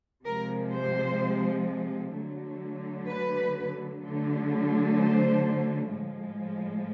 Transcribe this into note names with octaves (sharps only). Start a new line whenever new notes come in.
C3 F3 G#3 A#4
C5
D3 F#3 A3
B4
D3 F#3 A3
C5
A2 F3 G#3